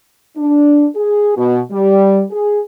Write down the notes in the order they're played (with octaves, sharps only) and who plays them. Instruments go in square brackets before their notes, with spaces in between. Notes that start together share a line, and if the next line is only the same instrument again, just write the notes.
[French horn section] D4
G#4
B2
G3
G#4